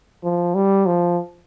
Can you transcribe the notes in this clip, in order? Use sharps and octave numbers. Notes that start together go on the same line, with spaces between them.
F3
G3
F3